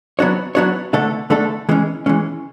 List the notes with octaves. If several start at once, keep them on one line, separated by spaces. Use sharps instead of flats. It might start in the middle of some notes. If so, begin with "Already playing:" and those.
F#3 B3 D4 F#4 C#5
F#3 B3 D4 F#4 C#5
D3 A3 D4 A4
D3 A3 D4 A4
E3 G#3 C#4
E3 G#3 C#4